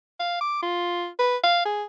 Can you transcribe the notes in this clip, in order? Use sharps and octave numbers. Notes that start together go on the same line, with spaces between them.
F5
D6
F4
B4
F5
G#4